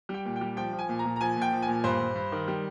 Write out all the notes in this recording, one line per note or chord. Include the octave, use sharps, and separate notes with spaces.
G3
G5
A#2
G5
G3
F3 G5
F3
G#5
A#2
A#5
A#2
A#5
F3 G#5
A#2
G5
F3
G#5
A#2
G2 C5
G2
G2
D#3
G3